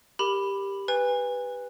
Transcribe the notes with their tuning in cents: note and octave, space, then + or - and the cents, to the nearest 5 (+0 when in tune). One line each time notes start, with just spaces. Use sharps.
G4 +10 A#4 +0 B5 +0
B4 +0 G#5 -30